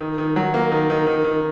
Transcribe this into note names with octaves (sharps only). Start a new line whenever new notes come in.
D#3
D#3
F#3
A#3
D#3
D#3
D#3
D#3